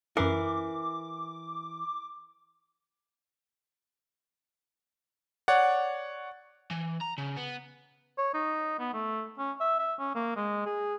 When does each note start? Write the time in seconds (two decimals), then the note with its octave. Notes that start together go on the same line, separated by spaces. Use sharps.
0.17 F#2 E3 A#4 D6 C7
5.48 C#5 D5 F#5
6.71 E3
7.01 A#5
7.18 C#3
7.37 B3
8.18 C#5
8.34 D#4
8.79 B3
8.94 A3
9.38 C#4
9.61 E5
9.79 E5
9.99 C#4
10.15 A#3
10.36 G#3
10.66 G#4